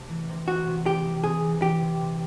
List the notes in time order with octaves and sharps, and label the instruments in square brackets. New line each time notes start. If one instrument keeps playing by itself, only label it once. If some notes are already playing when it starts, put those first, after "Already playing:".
Already playing: [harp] C3 A3
E3
C3
[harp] C3 [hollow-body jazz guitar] F#4
[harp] C3
[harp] C3 [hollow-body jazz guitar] G4
[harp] E3
[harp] C3 [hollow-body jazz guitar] G#4
[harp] E3
[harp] E3 [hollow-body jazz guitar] G4
[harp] C3
C3